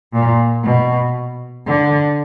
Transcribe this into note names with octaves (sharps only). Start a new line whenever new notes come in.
A#2
B2
D3